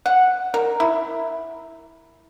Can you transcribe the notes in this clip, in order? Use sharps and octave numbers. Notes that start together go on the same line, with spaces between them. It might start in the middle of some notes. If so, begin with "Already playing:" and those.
F#5
A#4
E4